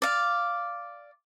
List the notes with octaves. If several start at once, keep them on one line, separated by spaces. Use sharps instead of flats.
D5 F5